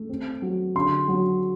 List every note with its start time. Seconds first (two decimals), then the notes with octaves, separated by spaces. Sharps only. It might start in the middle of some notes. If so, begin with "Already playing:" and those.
Already playing: A3
0.09 C4
0.42 F#3
0.75 D3 C6
1.08 F#3